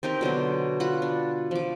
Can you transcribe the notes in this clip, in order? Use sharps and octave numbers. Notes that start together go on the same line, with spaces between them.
C4 D#4 G4 A#4
B2 D3 F#3 C5
F4 F#4 F#5 B5
D4
F3 D6